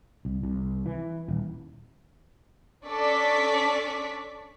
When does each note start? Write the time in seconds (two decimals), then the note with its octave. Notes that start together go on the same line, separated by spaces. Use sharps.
0.25 C2
0.43 C2
0.86 E3
1.28 D#1
2.86 C#4 D4 A4 D5 C#6 B6